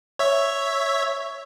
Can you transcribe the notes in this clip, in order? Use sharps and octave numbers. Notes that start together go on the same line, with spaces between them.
C#5 E5